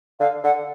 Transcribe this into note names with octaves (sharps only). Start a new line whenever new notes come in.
D3 F5
D3 F#5